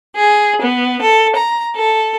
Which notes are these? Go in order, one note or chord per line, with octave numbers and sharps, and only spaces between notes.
G#4
B3
A4
A#5
A4